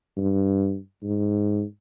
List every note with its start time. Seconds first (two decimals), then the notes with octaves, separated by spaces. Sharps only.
0.17 G2
1.03 G#2